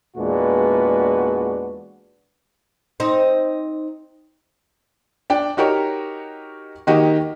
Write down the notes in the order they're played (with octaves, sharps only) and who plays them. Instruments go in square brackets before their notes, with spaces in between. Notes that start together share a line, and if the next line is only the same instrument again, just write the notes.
[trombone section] E2 A#2 G#3 D4 F#4 B4
[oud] C4 D#4
[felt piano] D4 G5
D#4 F#4 G4 A#4 C#5
D#3 A#3 F#4 G4 D#5